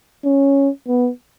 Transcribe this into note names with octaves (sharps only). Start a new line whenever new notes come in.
C#4
B3